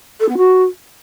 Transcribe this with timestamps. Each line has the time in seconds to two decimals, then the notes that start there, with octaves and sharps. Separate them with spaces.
0.20 A4
0.28 B3
0.37 F#4